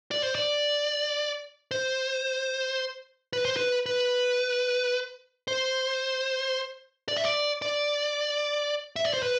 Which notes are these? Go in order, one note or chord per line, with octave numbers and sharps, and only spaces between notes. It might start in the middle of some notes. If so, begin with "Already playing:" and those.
D5
C5
D5
C5
B4
C5
B4
B4
C5
D5
E5
D5
D5
E5
D5
C5
B4